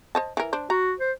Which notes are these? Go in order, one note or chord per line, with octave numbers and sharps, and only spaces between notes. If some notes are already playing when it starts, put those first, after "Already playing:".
C5 D#5 A5
E3 A#4
D4 C5
F#4 A#5
C5